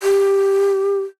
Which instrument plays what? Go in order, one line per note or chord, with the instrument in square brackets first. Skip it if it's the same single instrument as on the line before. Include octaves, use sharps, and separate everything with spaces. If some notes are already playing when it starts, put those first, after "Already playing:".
[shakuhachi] G4